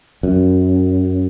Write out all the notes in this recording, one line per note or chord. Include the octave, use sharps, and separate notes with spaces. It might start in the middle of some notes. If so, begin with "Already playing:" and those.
F#2